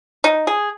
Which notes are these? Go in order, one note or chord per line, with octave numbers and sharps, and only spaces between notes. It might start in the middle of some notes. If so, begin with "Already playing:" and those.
D#4
G#4